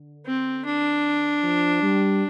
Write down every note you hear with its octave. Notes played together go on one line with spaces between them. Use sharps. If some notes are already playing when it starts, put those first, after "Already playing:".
Already playing: D3
C4
D4
F3
G3